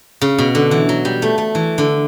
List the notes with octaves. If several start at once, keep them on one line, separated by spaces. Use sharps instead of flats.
C#3
B2
D3
E3
F#3
G3
A3
A3
E3
D3